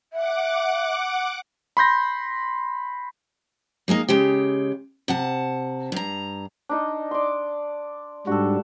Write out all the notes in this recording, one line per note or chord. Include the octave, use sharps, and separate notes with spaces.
E5 F#5 D6
B5 C6 G6 A#6
G3 G#3 A#3 D#4
C#3 G#3 G4
C3 F#5 A5
G2 A#5
D4 D#4 D#5
D5 C6
G#2 G3 D4 F#4 A4